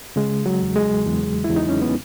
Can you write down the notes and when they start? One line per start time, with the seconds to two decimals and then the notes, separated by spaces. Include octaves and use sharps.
0.16 C#3 G#3
0.46 F#3
0.61 E2
0.76 G#3
1.06 E2
1.44 E2 E4
1.56 D#4
1.69 C#4
1.82 B3